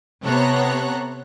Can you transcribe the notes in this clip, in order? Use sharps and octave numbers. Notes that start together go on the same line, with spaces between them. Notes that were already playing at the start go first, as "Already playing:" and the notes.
C3 B3 A4 C#5 A#5 F#6